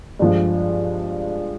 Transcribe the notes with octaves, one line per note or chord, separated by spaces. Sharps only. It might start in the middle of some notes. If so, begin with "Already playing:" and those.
G2 F3 G#3